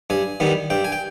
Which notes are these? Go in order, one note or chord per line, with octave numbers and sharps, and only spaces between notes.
G2 G#5
D#3 G3 B3 D#4
G2 G5
G#5
G5